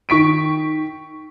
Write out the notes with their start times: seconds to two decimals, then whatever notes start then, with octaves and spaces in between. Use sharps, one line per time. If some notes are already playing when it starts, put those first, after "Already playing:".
0.09 D#3 C#6 B6 D7